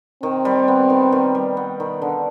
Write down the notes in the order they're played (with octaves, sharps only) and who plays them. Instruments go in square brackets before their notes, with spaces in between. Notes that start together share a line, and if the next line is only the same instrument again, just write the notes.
[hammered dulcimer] D#3 [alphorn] C4
[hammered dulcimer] G3
B3
D#3
D#3
G3
B3
D#3
D3